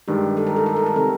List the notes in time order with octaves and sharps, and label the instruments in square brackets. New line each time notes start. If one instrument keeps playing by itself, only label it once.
[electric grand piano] G2 D#3 G#3 [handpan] G4
[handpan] A4
A#4
A4
A#4
A4
A#4
[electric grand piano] C3 D#3 [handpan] A4